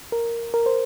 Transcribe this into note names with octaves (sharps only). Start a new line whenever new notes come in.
A#4
A#4
C5